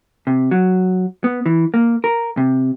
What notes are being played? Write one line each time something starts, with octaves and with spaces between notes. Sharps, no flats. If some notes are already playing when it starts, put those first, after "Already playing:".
C3
F#3
B3
E3
A#3
A#4
C3